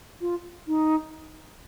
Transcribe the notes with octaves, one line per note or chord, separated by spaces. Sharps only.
F4
D#4